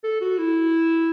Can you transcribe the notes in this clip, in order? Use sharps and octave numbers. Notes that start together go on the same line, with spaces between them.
A4
F#4
E4